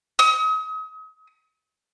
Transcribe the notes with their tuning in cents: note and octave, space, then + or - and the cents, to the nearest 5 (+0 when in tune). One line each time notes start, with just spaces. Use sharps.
D#6 +40